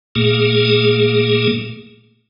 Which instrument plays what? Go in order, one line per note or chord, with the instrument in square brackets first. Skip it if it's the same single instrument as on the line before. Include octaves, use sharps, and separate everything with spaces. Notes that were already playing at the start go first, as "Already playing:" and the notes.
[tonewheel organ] A#2 A3 A#3 G#4